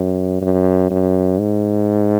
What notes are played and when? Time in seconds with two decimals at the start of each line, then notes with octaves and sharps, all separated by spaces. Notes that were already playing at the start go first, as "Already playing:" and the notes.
Already playing: F#2
0.41 F#2
0.90 F#2
1.39 G#2